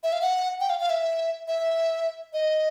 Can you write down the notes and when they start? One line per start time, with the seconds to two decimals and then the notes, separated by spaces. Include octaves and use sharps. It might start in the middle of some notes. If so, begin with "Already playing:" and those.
0.03 E5
0.13 F5
0.22 F#5
0.60 G5
0.70 F5
0.80 F5
0.90 E5
1.48 E5
2.33 D#5